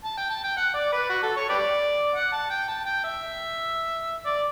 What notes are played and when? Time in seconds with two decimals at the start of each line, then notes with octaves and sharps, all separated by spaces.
0.05 A5
0.17 G5
0.31 A5
0.44 G5
0.57 F#5
0.74 D5
0.93 B4
1.10 F#4
1.23 A4
1.37 C#5
1.49 G4 B4 D5
2.16 F#5
2.33 A5
2.51 G5
2.68 A5
2.85 G5
3.04 E5
4.26 D5